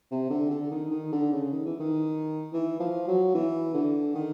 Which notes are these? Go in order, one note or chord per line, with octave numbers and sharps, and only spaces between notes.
C3
D3
D3
D#3
D#3
D3
C#3
D#3
E3
D#3
E3
F3
F#3
E3
D3
D#3